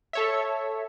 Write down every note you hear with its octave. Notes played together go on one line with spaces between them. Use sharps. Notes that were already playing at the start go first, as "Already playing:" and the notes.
A4 C#5 E5